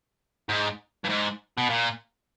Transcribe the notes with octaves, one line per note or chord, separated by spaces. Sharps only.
G#2
G2
G#2
B2
A#2